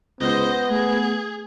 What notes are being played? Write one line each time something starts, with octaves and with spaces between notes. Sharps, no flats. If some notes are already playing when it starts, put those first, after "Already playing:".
C#2 B3 C5 D#5
A3 G#4